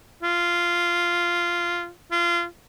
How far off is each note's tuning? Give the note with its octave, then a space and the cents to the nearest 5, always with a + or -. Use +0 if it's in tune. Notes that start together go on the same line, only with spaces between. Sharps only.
F4 -10
F4 -25